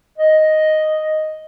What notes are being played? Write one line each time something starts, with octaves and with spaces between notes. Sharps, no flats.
D#5